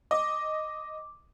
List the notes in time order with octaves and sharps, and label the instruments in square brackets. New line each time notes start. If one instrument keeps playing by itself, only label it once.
[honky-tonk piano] D#5 [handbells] D6